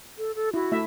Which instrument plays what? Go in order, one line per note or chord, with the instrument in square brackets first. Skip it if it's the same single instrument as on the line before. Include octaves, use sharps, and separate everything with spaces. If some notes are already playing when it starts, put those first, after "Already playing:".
[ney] A4
A4
[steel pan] E4 [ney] F#4
[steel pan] A3 E4 E5